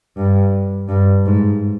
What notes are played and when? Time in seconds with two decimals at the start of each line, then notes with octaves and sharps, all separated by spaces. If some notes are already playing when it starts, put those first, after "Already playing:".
0.16 G2
0.89 G2
1.26 G#2